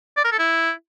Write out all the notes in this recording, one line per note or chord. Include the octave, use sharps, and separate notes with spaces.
D5
A#4
A4
E4